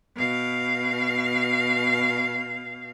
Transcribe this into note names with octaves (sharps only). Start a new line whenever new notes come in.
B2 F5